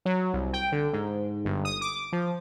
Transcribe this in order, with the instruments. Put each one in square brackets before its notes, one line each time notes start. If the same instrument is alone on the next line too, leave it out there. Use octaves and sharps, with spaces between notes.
[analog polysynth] F#3
C2
G5
D3
G#2
G1
D#6
D6
F3